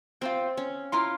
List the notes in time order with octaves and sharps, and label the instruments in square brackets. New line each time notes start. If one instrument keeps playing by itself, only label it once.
[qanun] C4 [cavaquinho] F4 C5 G5
[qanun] C#4
[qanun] E4 [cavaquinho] F4 A#4 F5 C6